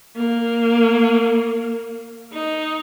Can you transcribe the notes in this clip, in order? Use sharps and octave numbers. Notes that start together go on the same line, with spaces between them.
A#3
D#4